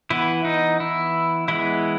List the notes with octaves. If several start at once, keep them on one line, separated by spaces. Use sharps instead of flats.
E3 B3 E4
D#4
E4
E3 G#3 B3 E4